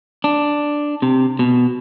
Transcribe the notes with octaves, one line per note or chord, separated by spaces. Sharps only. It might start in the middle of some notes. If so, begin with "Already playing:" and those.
D4
C3
B2